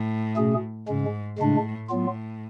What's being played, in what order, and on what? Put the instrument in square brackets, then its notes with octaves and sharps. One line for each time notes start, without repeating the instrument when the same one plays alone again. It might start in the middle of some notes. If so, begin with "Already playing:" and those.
Already playing: [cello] A2
[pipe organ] B2 A3 C#4 G#4
[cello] G#2 [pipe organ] C#3 G#3 C#4
[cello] A2 [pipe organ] C#3 G#3 D4
[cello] A2 [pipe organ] F#3 B3 F4